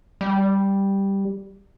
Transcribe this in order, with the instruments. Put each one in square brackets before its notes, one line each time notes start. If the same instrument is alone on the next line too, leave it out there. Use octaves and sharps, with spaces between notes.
[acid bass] G3